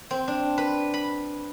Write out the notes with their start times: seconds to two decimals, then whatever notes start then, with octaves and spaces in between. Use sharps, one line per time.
0.11 C4
0.28 D4
0.58 B4
0.94 B5